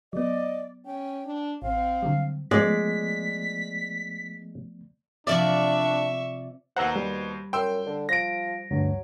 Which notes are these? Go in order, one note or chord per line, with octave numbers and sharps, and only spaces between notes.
F#3 B3 D5 D#5
C#4 G5
D4
A1 C4 F5
D3 F#3 G3
F3 G#3 A3 B3 D5 B6
C3 F3 C4 D4 D5 E5 C#6
D#2 B2 C5 F#5 A#5 E6
G3
F#2 G5 C6 E6
D3
F3 A#6 D7
D2 G2 F#3